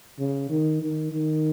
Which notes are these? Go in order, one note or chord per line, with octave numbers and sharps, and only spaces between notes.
C#3
D#3
D#3
D#3